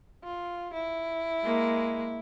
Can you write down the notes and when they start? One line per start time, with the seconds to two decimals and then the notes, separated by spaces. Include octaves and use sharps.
0.23 F4
0.73 E4
1.43 G#3 A#3